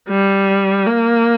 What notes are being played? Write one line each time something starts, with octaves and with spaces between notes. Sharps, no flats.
G3
A#3